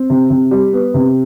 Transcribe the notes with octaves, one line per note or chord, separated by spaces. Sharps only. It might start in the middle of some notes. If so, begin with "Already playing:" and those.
Already playing: C4
C3
C3
G3
B3
C3